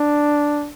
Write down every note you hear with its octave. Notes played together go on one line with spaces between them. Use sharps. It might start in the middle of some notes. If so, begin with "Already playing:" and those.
Already playing: D4